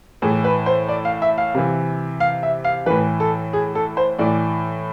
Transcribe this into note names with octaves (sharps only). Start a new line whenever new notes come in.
A2 E3 G#4
B4
C5
D5
F5
E5
F5
C3 E3
F5
E5
F5
A2 E3 B4
A4
G#4
A4
C5
A2 E3 D5